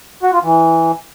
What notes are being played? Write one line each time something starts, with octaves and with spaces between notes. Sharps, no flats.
F#4
F4
E3